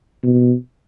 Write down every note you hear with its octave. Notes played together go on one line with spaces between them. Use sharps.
B2